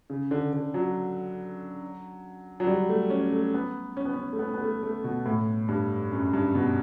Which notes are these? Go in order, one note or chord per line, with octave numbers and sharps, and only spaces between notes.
C#3
D3
D3
F#3
F#3
G3
A3
C#4
A3
B3
C#4
B3
C#4
A3
B3
B3
A3
A3
B2
A2
G2
F#2
G2
B2